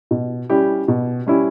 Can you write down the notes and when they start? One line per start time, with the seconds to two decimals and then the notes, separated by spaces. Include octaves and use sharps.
0.11 B2
0.50 G3 C#4 E4 G4
0.88 B2
1.27 G3 C#4 E4 G4